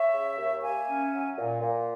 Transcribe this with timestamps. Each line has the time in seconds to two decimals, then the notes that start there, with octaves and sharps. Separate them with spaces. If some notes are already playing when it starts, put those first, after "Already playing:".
Already playing: C#5 E5
0.13 C#3
0.38 D#2
0.62 A#3 E5 G#5
0.88 C#4
1.12 F#3
1.37 A#2
1.61 A#2